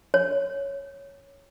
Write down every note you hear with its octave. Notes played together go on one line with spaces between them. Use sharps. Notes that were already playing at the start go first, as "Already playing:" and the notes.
C#5